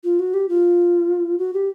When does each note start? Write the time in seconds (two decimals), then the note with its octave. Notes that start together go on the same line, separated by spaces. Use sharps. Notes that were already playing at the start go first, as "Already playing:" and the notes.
0.04 F4
0.19 F#4
0.34 G4
0.49 F4
1.38 F#4
1.54 G4